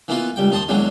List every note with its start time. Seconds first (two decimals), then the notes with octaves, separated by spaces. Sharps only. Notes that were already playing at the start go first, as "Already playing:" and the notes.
0.08 E3 A#3 B3 D#4 F4 F#4
0.36 C#2 G3 G5
0.51 D#2 D#4 A5 C6 D#6
0.68 E2 D3 D#3 F#3 G#3 A#3